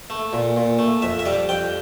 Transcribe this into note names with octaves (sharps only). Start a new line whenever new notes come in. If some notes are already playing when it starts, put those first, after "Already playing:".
A3
A#2
A#2
A3
F2 E5
E5
G3 D5
F2 G5